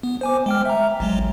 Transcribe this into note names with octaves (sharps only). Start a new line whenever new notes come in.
B3
C5 G#5 D6
G#3 G5 F6
E5 A#5
A1 F#3 G#3